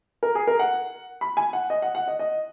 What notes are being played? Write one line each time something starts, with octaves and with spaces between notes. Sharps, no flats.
A#4
G#4
A#4
F#5
B5
G#5
F#5
D#5
F#5
F#5
D#5
D#5